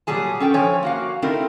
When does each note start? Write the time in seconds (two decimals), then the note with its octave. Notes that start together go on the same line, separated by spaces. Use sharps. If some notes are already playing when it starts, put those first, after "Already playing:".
0.07 A#2 F#3 G3 G#4 A5
0.40 C#4 A4 G5
0.54 F3 C#5 G#5
0.83 A#3 F#4 F5
1.22 A3 C4 D#4 E4 A#4